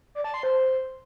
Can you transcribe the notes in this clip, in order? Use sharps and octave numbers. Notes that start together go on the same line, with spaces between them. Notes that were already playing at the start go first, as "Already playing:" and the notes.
D5
A5
C6
C5